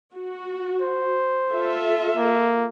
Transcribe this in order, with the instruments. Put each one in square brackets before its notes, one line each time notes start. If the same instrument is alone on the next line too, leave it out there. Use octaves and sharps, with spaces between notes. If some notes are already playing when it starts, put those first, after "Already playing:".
[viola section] F#4
[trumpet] C5
[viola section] F4 A4 E5
[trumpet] A#3